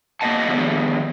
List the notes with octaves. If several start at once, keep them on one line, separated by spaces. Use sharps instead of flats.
A#3 C4 D#5 F#5 A5
D3 D#3 F3 G#3 B3 G4